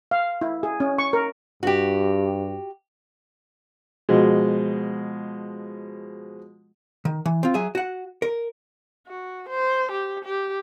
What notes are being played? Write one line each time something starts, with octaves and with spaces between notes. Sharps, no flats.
F5
E4
G#4
C#4
C#6
A#4
G2 F#4 G4
B2 F3 G#3
D#3
E3
C4 F4
F#3 G#4 E5
F#4 F#5
A#4
F#4
C5
G4
G4